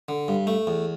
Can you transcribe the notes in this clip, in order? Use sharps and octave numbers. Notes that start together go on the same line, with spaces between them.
D3
G2
A3
E2